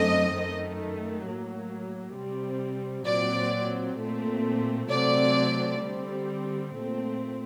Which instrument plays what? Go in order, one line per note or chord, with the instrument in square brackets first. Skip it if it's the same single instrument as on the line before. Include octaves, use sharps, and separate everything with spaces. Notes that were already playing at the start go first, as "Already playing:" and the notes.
Already playing: [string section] F#2 D3 A3 C4 D#5
F#2 D#3 A3
A2 F#3 A#3
C3 G3 C4
A#2 F#3 C4 D5
A#2 A3 C4
C3 F#3 A3 C4 D5
D3 G3 C4
A#2 A3 C4